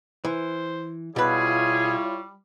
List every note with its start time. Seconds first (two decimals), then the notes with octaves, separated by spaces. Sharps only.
0.25 E3 C5
1.16 B2 G3 E4 F4 G#4 B4 C#5